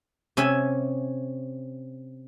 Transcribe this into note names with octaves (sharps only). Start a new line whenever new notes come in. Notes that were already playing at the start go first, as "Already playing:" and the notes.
C3 C#4 E5 G#5